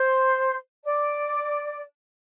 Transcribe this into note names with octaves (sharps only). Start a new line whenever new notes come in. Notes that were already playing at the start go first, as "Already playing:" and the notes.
Already playing: C5
D5